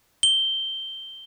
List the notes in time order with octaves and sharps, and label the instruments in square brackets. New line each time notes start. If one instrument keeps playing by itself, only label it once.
[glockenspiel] G7